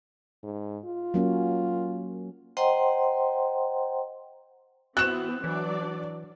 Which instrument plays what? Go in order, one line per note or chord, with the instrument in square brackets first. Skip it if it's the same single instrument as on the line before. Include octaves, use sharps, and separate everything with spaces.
[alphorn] G#2
F4
[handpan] F#3 A#3 C#4
[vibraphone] C5 D#5 F#5 G5 A#5 C6
[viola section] E3 B3 C4 [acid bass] F#4 [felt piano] F#6 E7
[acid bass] E3 [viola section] F#3 D4 D5